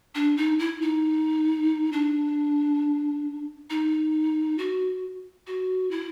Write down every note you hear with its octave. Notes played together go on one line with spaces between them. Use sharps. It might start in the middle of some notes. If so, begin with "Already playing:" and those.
D4
D#4
E4
D#4
D4
D#4
F#4
F#4
E4